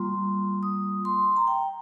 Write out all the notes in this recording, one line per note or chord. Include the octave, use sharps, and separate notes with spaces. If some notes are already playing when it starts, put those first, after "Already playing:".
Already playing: G3 A#3 F4 C6
D#6
C6
A#5
G5